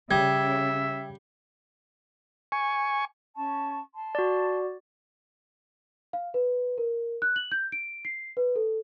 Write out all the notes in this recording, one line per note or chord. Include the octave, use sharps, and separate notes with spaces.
C#3 G3 E5 G5 D6 G#6
G#5 C#6
C#4 A5 C#6
A5 C6
F#4 D5
F5
B4
A#4
F#6
F#7
G6
D7
C7
B4
A4